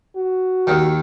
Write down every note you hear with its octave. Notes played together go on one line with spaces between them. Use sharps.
F#4
D#2 D#3